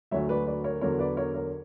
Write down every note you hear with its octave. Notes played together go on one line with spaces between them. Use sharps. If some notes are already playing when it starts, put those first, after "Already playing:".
D2 D3 F#3 C#5 E5
B4 D5
B4 D5
A#4 C#5
E2 D3 F#3 A#4 C#5
B4 D5
A#4 C#5
A#4 C#5